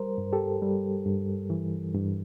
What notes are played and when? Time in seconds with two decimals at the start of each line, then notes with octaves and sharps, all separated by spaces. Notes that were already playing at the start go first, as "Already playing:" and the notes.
Already playing: G3 A#4 C5
0.18 G2
0.33 G4 A4
0.62 G3
1.06 G2
1.50 E3
1.94 G2